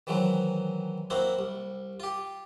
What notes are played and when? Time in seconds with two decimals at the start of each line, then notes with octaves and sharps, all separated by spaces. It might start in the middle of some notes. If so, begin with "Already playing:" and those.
0.07 D#3 E3 F#3 G#3 C4
1.10 A#3 C4 E4 F#4 C5
1.39 C2
2.00 F4 G4